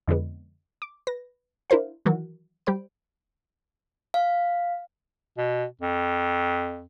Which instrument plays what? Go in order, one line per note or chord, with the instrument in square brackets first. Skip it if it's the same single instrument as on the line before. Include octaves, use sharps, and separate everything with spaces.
[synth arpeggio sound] F2 D3 F3 G#3 B3
D6
B4 A#6
D4 E4 A#4 C5 F5
D#3 E3 F#3 F#4 A#4
G3 G4 C5 B5 D7
[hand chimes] F5
[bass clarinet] B2
F2